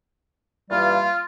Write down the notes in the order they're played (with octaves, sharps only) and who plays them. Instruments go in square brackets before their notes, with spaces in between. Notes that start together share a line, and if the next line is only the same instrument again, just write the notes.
[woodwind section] G2 E3 G3 A#3 F4